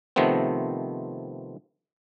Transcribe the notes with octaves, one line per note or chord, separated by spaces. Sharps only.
C3 D#3 F3 A3 B3 C4